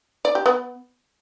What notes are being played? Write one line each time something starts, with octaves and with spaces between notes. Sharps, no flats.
D5
G4
B3